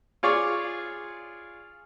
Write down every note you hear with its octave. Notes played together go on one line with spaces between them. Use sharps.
F4 G#4 C#5 D5 C#6